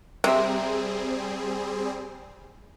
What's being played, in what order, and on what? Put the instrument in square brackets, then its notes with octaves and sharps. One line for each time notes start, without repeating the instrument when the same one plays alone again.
[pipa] C3 [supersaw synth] G3 C4 G#4 [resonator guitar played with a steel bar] A#4 C5 E5